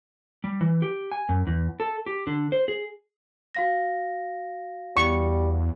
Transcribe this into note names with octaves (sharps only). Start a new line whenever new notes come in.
G3
E3
G4
G#5
F#2
E2
A4
G4
D3
C5
G#4
F#4 F5 A#6
E2 G3 C#6